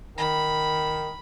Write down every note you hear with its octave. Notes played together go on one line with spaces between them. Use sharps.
D#3 B5